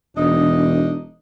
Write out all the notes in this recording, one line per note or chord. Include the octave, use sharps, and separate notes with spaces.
E1 D4 D#4 D#5